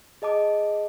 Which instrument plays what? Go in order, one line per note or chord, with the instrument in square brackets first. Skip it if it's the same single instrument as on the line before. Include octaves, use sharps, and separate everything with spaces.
[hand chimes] G#4 D#5 A5 D6